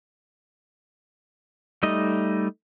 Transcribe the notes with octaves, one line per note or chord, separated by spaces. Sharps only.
G3 A3 D#4 D#5